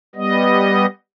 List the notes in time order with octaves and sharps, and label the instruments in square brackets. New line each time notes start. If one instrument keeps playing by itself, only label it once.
[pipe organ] G3 B3 D#5